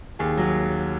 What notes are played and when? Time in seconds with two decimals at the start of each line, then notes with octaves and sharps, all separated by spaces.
0.19 D#2 G#4
0.37 F#3